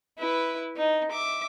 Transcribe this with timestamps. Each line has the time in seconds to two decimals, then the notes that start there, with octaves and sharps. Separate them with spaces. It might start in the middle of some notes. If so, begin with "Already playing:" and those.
0.19 E4 B4
0.77 D#4
1.11 E5 D6